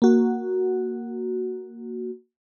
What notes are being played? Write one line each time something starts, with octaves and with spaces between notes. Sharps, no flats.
A#3 F#4